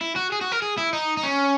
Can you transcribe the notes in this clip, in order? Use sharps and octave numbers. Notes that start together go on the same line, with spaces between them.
E4
F#4
G#4
F#4
A#4
G#4
E4
D#4
D#4
C#4